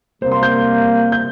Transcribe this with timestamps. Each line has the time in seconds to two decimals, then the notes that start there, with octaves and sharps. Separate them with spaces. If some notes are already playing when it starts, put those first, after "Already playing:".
0.22 C3 G3 A#3 C5
0.32 C6
0.43 G6
1.12 G6